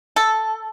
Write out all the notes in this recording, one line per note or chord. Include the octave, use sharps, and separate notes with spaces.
A4